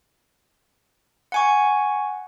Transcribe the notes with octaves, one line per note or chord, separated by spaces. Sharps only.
F#5 G#5 C#6